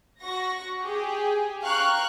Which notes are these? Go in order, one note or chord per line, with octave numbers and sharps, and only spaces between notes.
F#4 C#6 A#6
G4 G#4
F5 G5 A#5 C#6 F6 F#6